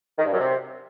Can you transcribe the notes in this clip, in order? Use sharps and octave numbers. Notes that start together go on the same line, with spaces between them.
D#3
G2
F#2
C3